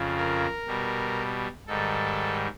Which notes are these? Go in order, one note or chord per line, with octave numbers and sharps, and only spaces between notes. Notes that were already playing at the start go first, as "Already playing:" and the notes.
Already playing: F2 C#3 F3
A#4
B2 G3
G#2 D#3 G3 A4